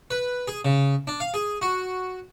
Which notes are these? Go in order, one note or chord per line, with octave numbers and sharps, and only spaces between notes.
B4
G#4
C#3
D4
F5
G#4
F#4